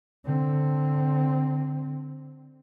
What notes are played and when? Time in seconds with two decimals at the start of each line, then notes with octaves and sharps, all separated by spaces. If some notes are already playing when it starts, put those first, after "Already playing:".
0.25 D3 C4